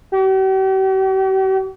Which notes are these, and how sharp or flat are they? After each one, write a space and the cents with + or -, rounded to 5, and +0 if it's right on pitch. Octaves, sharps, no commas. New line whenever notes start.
G4 -45